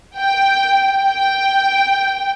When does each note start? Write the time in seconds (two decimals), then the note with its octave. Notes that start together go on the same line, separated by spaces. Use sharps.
0.17 G5
1.02 G5